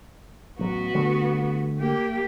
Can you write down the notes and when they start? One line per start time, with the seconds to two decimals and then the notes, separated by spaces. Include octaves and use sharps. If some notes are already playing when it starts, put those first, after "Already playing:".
0.59 A1 F#3 B3 F#4
0.95 D3 G3 A3
1.79 A#3 G4